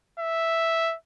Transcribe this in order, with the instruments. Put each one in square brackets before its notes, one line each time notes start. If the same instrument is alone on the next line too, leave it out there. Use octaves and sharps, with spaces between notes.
[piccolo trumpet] E5